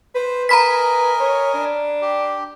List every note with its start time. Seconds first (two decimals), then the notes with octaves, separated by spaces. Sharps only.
0.15 B4 C5
0.49 A#4 D#5 G#5 A#5 B5 B6
1.20 C#5
1.54 D4
2.02 G4